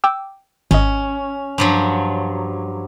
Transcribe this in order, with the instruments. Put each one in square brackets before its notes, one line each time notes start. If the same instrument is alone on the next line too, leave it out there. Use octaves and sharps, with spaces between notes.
[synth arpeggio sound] G5 D6 E6
[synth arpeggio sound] G#1 D#5 [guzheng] C#4
[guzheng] G2 F3 F#3